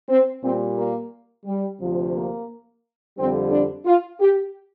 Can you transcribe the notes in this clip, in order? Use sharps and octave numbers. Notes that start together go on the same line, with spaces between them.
C4
A#2 G3 C4
A#3
G3
D2 C3 F3
A#3
F2 D3 G3 C4
D4
F4
G4